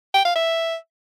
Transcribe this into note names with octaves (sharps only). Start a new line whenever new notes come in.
G5
F5
E5